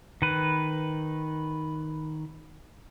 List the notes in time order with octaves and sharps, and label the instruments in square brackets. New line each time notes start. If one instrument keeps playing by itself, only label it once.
[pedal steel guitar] D#3 B4